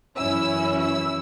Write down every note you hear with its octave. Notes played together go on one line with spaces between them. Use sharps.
F#2 E3 C#4 E4 E6
E6